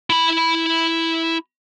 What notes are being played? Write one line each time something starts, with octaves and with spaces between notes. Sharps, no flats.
E4 B5